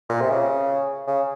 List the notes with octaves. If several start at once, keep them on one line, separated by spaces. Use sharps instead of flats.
A#2
C3
C#3
C#3